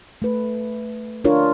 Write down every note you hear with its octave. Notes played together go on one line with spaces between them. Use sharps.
A3 B4
D4 F4 A#4 C#5